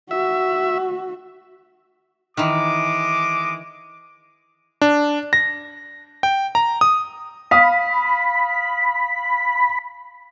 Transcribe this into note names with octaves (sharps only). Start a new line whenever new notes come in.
F#4 E5
D#3 E3 G#3 D6
D4
A#6
G5
A#5
D#6
F5 B5 D#6